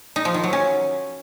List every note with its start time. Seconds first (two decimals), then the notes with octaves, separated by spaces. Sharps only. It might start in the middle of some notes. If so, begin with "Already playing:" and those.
0.16 D#4
0.25 F3
0.34 D#3
0.44 F#3
0.53 C#4